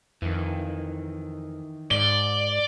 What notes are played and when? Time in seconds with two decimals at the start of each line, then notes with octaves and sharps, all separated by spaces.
0.22 F2 D#3 E3
1.91 G#2 D5 G7